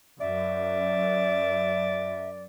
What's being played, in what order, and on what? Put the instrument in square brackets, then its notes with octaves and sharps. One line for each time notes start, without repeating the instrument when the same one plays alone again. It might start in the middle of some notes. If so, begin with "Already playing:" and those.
[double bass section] F#2 [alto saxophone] D5 [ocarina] E5